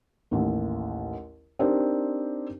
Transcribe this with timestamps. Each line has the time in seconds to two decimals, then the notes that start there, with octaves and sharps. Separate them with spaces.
0.31 A1 D#2
1.59 C4 D4 D#4 G4 A#4 C5